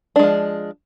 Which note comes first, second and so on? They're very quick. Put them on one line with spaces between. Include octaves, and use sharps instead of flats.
D4 G#3 F3